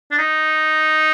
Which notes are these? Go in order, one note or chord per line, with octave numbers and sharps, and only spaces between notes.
D4
D#4